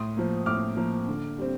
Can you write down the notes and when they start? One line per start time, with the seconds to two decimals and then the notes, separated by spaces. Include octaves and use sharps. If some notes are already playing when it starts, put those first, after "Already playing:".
Already playing: A2 C6 D#6
0.17 F3 A#3
0.46 A2 D6 F6
0.77 F3 A#3
1.08 D3
1.38 G3 C4